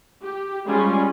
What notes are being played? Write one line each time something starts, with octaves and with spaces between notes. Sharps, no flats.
G4
G3 G#3 C#4 F4 G#4